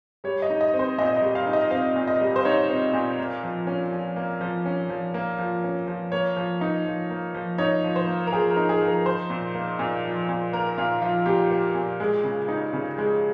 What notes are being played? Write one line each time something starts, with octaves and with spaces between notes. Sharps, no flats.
G3 C#5
D#5
D#4
D#5
C4
C5
A#2 D#5
D#5
G3
F5
D#4
D#5
C4 F5
A#2
D#5
G3
C5
D#4 C#5
C4
A#2
A#3
F3
C#4
F3
A#3
F3
C#4
F3
A#3
F3
C#4
F3
A#3 C#5
F3
D#4
F3
A#3
F3
D#4 C#5
F3
C5
A#3
A#4
F3 G#4
A#4
D#4
G#4
F3
A#4
F3 C5
A#2
A#3
A#2
F3
A#2
A#3 A#4
A#2 F4
F3 F4
A#2 G4
A#3
A#2
G#3
C#3
D#4
C#3
G#3